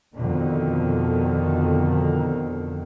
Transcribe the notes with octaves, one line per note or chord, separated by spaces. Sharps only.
F2 B2 D3 D#3